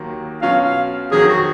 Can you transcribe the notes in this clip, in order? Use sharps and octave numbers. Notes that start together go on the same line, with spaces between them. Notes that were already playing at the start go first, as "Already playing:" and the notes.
Already playing: D#2 D#3 F#3 A#3
B2 F#3 C#4 F4 F5
F5
F2 D#3 F#3 G#4
F#4